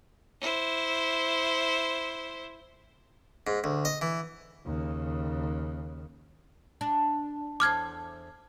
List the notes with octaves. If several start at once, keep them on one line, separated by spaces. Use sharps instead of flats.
E4 C5
G#2
D2
D#5
E3
D#2 C#3
D4
E2 A4 C5 D6 F6 G#6